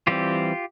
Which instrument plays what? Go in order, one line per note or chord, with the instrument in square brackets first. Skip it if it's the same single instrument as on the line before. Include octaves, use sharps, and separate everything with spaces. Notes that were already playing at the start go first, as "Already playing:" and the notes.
[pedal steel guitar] E3 G3 C4 F4 G4